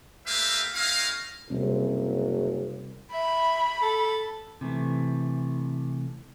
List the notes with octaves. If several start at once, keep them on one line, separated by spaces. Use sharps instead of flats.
A3 A#3 G4 B4 E5 F5
A3 C#4 E4 D#5 F5
F#1 C3 G3 C4
E5 B5
A4
C3 E3 A3